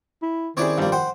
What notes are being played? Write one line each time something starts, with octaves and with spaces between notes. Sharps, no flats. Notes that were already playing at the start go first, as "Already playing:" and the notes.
E4
D#3 C4 C#4 E4 G#4 C#5 D5
G2 F3 G3 A#3 C4
C5 F#5 G5